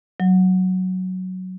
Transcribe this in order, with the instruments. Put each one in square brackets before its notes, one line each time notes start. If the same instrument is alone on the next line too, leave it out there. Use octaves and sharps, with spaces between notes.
[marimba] F#3